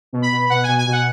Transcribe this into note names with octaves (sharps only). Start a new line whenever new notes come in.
B2
B5
B2
B2 F#5
B2 G#5
G#5
B2 F#5